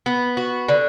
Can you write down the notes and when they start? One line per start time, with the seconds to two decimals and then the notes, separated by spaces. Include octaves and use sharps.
0.06 B3
0.37 F#4
0.68 D3